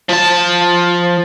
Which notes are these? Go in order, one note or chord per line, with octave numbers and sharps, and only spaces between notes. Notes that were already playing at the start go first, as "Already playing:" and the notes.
F3 A5